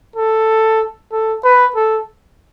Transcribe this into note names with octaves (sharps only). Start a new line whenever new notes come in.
A4
A4
B4
A4